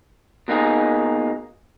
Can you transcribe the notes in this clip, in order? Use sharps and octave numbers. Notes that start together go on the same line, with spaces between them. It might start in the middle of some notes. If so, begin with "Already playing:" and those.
B2 A#3 D#4 G#4